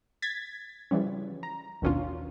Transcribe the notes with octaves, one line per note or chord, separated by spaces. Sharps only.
G#6 A6 B6
C#3 E3 F3 G3 C#4
A#5
A1 D#2 B2 C#4 D4 F4